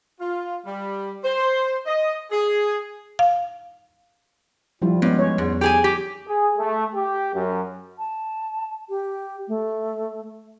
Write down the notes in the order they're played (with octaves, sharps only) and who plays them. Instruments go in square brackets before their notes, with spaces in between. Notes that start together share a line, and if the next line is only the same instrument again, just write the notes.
[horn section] F4
G3
C5
D#5
G#4
[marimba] F5
[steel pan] F3 G3 E4 [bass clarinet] F4
[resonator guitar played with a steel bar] G2 [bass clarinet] G#3 [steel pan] B3 C#4
[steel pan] C#4 C#5
[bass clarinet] E2 [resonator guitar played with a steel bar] G#2
[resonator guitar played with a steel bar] G4 G#4 G#5
G4
[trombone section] G#4
A3
G4
F#2
[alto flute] A5
G4
A3